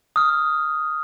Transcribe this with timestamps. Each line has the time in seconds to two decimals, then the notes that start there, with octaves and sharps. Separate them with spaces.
0.16 D#6 F6